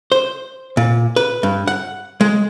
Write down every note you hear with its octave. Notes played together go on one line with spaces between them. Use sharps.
C5
A#2
B4
G2
F#5
G#3